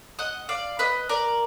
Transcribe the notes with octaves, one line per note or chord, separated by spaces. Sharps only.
D#5 F#5
D5 F5
B4 D#5
A#4 D5